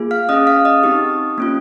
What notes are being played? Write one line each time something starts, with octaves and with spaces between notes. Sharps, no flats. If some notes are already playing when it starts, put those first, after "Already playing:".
Already playing: A#3 F4 G#4
F5 F6
C#4 G#4 D#5 D#6
F5 F6
D#5 D#6
C4 D#4 G4
A#3 C#4 F4